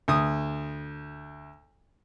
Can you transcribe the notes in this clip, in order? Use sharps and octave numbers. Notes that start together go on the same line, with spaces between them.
D2 D#6